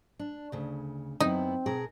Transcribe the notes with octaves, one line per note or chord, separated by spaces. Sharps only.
D4
D2 C#3
F#2 B3 C4 D#4 E4
B2 G#4 A#4